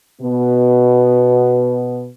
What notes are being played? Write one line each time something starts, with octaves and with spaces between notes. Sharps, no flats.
B2 B3